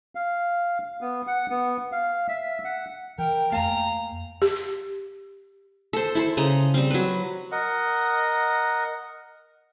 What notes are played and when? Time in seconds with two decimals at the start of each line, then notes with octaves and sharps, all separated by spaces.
0.15 F5
1.01 B3
1.27 F#5
1.50 B3
1.92 F5
2.29 E5
2.65 F#5
3.18 E3 A#4 G5
3.52 F2 A3 A#3 F5 G#5 A#5
4.42 G4
5.93 A4 C5
6.15 E4 A4 C5
6.37 C#3 D#5 A#5
6.74 G3 C4
6.91 F#3 B4
7.52 A#4 D#5 F#5